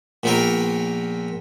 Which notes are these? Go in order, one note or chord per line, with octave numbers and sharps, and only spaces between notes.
A#1 A#2 B3 C4 F4 A#4